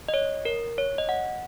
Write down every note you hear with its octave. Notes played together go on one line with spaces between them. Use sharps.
D#5
C#5
A#4
C#5
D#5
F#5